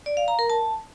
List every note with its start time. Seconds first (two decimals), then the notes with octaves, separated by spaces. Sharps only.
0.06 D5
0.17 F5
0.28 A#5
0.39 A#4
0.50 A5